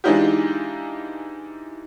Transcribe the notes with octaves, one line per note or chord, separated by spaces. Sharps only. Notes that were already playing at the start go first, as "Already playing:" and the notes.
E3 G#3 D4 D#4 F4 G4